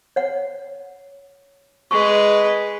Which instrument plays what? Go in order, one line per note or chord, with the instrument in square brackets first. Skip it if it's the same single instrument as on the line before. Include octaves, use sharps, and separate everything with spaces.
[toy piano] C#5 F#5
[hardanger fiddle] G#3 B4 [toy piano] C#6